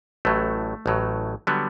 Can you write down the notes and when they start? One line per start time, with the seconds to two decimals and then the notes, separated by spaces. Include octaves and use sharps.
0.25 A1 A2 F#3 A3
0.86 A1 A2 F#3
1.47 D3 F#3 G3 B3